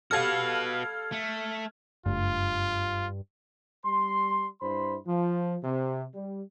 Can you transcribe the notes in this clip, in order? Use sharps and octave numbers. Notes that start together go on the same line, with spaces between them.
G3 F#4 A4 B4 F5 F6 G#6
A3
F#1 G2 A3 F4
G3 C6
G2 E4 C5 B5 C6
F3
C3
G3